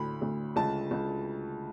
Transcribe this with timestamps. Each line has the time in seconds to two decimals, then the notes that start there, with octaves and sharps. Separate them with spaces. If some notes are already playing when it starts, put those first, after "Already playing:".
Already playing: D2 A2 B5
0.22 D2
0.56 C#2 A5
0.91 C#2